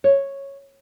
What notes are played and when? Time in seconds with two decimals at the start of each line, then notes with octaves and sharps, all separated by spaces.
0.04 C#5